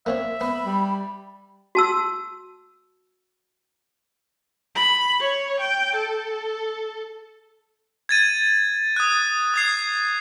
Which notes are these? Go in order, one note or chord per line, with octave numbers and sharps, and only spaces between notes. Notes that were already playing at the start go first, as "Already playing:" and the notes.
A#3 C4 C#5 E5
B3 B5
G3
F#4 A5 E6
B5
C#5
G5
A4
G#6 A6 D#7
D#6 F#6
D#6 G#6 C7